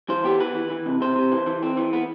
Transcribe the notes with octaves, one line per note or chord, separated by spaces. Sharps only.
E3 C5
B3 G4
E3 B4
E3
E3
C3
C3 C5
C3
E3
E3
C4
E3
B3